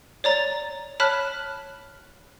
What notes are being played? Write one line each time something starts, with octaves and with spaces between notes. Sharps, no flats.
C#5 D5 A#5 A6
C#5 A5 B5 F6 F#6 B6